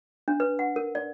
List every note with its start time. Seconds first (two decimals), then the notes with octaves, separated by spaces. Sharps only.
0.28 D4
0.40 B4
0.59 F#5
0.76 A#4
0.95 D5